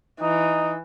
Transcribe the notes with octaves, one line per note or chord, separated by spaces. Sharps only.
E3 D#4